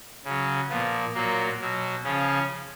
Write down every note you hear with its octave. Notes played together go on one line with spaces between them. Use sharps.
C#3 F#3
A#2 F3 B3
A#2 F#3 A#3
B2 F#3
C#3 F3 C#4